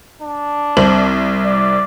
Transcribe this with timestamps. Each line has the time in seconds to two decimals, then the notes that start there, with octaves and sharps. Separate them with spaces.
0.22 D4
0.77 C2 C4 F#7
1.45 D5